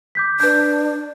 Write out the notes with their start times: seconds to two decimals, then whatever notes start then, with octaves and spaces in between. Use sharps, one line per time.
0.15 D6 G6 B6
0.40 D4 B4 G6